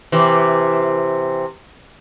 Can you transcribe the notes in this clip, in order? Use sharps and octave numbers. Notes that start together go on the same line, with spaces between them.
C3 E3